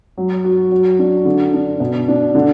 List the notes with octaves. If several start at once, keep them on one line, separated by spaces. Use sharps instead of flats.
F#3
F#4
F#3
D4
D3
D4
B2
D4
D3